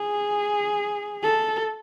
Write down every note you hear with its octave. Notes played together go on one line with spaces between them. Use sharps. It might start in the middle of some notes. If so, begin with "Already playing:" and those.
Already playing: G#4
A4